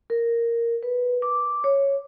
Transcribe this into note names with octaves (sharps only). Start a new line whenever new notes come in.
A#4
B4
D6
C#5